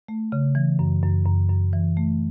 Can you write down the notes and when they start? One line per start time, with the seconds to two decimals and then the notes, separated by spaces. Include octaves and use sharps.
0.08 A3
0.32 C#3
0.55 E3
0.79 F#2
1.03 F#2
1.26 F#2
1.50 F#2
1.73 E3
1.97 A3